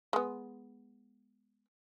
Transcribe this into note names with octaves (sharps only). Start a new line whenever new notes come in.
G#3 B3